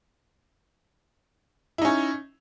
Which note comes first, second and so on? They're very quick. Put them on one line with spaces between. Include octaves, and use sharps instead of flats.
E4 D#4 C#4